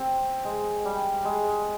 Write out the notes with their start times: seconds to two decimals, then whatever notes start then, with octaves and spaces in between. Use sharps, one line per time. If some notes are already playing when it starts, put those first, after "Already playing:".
Already playing: C4
0.45 G#3
0.85 G3
1.25 G#3